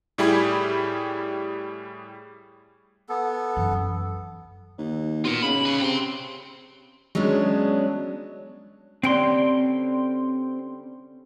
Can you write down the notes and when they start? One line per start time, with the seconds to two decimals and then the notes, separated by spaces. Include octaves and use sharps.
0.18 A2 G3 E4 G4 G#4 B5
3.09 B3 A4
3.56 F#2 E3
4.78 D#2
5.25 B2 F4 A#4
5.43 C#3 B5
5.66 B4 C#5
5.81 C3 G5 C6
7.15 F#3 G#3 B3 C#4 D4
9.03 D3 G3 C4 C#4 G5 C6